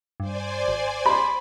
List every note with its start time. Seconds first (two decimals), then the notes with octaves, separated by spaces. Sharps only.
0.20 G2 C5 D5 G#5
0.68 G#1
1.06 B5 C6